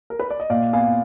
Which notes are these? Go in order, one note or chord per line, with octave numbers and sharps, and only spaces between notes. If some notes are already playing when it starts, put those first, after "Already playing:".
A#4
B4
D5
D#5
A#2 D5 F5
B3 F5 G#5